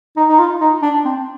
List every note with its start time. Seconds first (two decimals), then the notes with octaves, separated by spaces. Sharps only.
0.17 D#4
0.29 D#4
0.39 F4
0.61 D#4
0.82 D4
1.05 C4